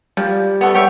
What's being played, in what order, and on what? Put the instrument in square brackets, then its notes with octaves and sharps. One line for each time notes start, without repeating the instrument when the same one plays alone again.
[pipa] F3 [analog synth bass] G3
[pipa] A3 B3
G4 C#5 E5